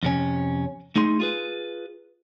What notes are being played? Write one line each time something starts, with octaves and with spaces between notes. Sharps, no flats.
F2 C3 C#4
A3 D#4 G#4 C6
F4 G#4 B4